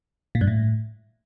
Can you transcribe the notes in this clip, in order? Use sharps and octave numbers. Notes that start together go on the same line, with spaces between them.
A#2
G2
A2